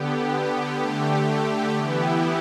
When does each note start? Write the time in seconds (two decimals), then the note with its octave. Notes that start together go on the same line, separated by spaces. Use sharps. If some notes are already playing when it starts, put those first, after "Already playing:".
Already playing: D3 B3 G4
0.80 D3 A3 G4
1.76 E3 B3 E4 G4